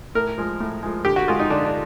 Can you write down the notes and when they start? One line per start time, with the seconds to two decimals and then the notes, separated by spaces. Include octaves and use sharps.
0.15 A2 A#4
0.38 F3 G#3
0.60 A2
0.83 F3 G#3
1.05 D3 G4
1.16 F#4
1.28 F3 G#3 F4
1.40 D#4
1.50 D3 D4
1.65 D4